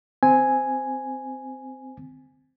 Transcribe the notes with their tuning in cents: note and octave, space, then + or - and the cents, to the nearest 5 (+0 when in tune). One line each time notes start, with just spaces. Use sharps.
C4 -10 G#5 +0